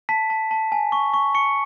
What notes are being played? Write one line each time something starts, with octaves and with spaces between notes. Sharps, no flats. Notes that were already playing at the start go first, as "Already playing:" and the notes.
A5 B6
A5
A5
G#5
C#6
C#6
C#6 C#7